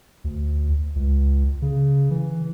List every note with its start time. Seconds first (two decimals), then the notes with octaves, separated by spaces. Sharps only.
0.24 D2
0.95 C#2
1.62 C#3
2.11 E3